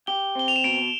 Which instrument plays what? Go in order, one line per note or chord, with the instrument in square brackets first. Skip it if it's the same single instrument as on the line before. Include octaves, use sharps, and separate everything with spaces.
[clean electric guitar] G4 [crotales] G7
[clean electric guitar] C4 [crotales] G7
[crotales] F7
E7
[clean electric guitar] B2 [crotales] D7